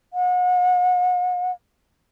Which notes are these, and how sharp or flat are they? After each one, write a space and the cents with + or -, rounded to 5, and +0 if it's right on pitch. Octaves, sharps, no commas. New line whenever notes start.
F#5 -40